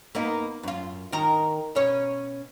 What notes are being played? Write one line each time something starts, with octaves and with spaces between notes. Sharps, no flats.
A#3 B3 D#4
F#2 F4
D#3 A#4
B2 C#4 C#5